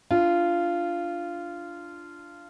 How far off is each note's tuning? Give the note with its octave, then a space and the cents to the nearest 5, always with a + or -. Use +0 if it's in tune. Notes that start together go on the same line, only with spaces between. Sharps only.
D4 +0 F4 -15